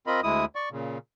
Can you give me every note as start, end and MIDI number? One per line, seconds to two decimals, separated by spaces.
0.07 0.21 60
0.07 0.21 65
0.07 0.21 70
0.07 0.21 75
0.07 0.21 83
0.23 0.45 38
0.23 0.45 56
0.23 0.45 64
0.23 0.45 87
0.55 0.69 74
0.55 0.69 85
0.71 0.98 46
0.71 0.98 49